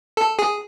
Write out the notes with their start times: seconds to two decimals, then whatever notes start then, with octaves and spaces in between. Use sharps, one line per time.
0.17 A4
0.39 G#4